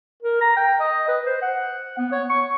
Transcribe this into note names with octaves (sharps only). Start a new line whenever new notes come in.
A#4
A#5
G5
D#5
B4
C5
F#5
B3
C#5
C#6